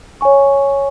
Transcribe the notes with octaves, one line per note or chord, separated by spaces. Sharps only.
C#5 G#5 C#6